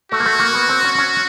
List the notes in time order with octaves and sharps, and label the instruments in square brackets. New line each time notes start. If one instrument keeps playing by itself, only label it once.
[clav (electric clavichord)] A3 [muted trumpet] F#4
[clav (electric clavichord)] A#3
A3
A#3
B3
C4
C#4
C#4